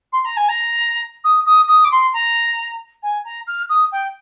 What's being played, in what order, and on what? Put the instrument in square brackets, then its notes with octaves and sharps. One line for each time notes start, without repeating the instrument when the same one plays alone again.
[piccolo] C6
A#5
G#5
A#5
D#6
D#6
D#6
D6
C6
A#5
G#5
A#5
F6
D#6
G5